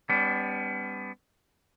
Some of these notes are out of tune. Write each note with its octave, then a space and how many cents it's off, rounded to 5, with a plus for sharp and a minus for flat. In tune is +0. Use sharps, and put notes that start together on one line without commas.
G3 +25 B3 +30 D4 -40